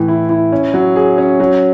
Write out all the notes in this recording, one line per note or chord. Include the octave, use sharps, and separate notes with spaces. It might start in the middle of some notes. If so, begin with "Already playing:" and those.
Already playing: A2 E3
E4
E4
C#4
F#3
G#4
C#4
F#3